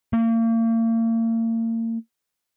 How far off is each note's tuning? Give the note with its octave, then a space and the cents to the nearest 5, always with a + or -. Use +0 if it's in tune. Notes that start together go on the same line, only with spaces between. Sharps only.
A#3 -40